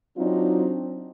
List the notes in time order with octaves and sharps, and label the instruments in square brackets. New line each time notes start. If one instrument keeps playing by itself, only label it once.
[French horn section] F#3 C4 D4 D#4 F4